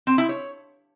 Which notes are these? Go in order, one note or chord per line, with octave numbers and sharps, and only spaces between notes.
C4
E4
C#5